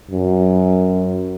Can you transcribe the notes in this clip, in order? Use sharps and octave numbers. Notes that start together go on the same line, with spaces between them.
F#2